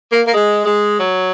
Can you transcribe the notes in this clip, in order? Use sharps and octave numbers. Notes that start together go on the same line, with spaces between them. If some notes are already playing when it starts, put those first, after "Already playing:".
A#3
A#3
G#3
G#3
F#3